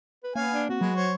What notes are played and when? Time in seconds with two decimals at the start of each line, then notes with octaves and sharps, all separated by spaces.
0.24 B4
0.36 A#3 B3 C#4 F5 G#5
0.51 D4
0.69 C4 F#4
0.81 F#3 G#3 B4
0.96 C5 C#5